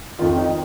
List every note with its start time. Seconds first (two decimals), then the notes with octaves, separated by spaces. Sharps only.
0.18 F2 D#3 F4
0.38 D#4